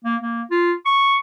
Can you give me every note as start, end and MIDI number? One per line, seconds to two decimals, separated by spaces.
0.04 0.16 58
0.21 0.42 58
0.51 0.73 65
0.85 1.16 85